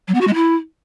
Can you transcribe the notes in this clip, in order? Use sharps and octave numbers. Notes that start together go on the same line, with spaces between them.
F#3
B3
F#4
G#3
E4